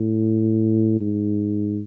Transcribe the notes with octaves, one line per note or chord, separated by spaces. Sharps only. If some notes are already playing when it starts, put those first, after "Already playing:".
Already playing: A2
G#2